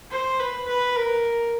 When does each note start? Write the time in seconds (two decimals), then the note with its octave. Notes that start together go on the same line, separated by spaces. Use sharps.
0.11 C5
0.39 B4
0.67 B4
0.95 A#4